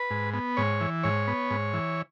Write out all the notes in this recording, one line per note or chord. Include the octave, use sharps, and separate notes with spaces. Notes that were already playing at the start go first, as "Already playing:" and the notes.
Already playing: B4
G#2
B3
G#2 C#5
E3
G#2 C#5
B3
G#2
E3